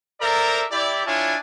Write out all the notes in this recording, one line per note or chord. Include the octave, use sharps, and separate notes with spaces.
A4 A#4 C5 D5 E5 A#5
E4 G4 D5
D4 E4 F4 C#5 G#5 A5